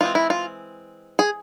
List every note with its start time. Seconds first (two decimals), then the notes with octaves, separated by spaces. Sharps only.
0.01 E3 G#3 C4 F4
0.15 E4
0.30 F4
1.19 G#4